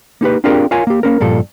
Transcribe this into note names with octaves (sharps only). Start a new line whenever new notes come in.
A#3 D#4 G4 B4
C4 D4 F4 G4 G#4 A#4
F4 A#4 C#5 F5 G#5
A#3 G4
A#3 C#4 A#4
G2 A#2 F3 A4